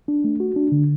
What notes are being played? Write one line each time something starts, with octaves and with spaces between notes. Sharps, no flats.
D4
A3
F#4
D4
D3